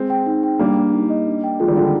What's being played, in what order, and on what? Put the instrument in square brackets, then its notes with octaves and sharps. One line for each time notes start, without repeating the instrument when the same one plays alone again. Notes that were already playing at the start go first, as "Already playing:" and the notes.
Already playing: [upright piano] G#3 C4
[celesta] G5
D#4
G5
[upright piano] G3 A#3 [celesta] D4
[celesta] D4
D#4
D#5
D4
G5
[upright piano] F3 G#3 [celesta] F4
[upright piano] D#3 G3
[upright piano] D3 F3 [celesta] G5
[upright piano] D#3